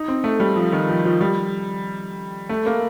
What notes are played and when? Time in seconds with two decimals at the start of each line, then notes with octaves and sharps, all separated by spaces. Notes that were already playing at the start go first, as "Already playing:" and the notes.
Already playing: D#4
0.08 C4
0.24 A3
0.40 G3
0.56 F3
0.72 D#3
0.89 F3
1.05 F3
1.21 G3
2.49 A3
2.66 A#3